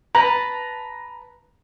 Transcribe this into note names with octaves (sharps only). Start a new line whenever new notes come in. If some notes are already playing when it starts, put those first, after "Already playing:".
B4 A5 A#5